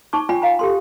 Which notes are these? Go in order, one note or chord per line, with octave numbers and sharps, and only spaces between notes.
D#4 A5 C#6 D6
F4 D5 G5 G#5 B5
F5 A#5 B5
G4 A4 C6